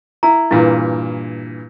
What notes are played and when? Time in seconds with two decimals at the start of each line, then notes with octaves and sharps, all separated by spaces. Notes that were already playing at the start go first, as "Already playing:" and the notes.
0.23 E4 A#5
0.51 G2 A#2 E3 E4